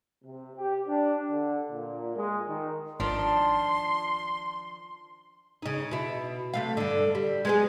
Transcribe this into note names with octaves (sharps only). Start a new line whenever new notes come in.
C3
G4
D4
D3
A#2
G#3
D#3
G#1 D#3 F3 D4 C6
C#3 D#4
B2 E4
C3 A3 F5
G2 D3
G3
G#3 B3 G#4